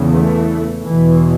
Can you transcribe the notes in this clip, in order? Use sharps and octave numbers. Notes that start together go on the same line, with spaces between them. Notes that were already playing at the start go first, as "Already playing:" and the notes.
Already playing: E2 C#3
E3 A3
E2 B2 E3